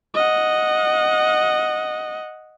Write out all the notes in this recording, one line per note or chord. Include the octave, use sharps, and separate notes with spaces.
D#5 F#5